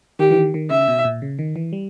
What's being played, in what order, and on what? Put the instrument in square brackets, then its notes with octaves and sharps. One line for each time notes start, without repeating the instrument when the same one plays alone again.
[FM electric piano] D#3 [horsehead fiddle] G4
[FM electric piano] E3
D#3
D#3
[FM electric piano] C#3 [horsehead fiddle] E5
[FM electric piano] B2
A#2
C#3
D#3
E3
G3